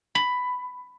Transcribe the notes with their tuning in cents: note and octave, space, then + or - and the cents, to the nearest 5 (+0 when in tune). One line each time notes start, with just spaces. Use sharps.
B5 +10